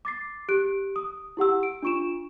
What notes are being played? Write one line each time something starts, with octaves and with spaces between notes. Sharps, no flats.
D6 A6 C7
G4 F#6 D7
D#6
E4 G4 F#5 E6
D7
D4 F4 C#6 D7 E7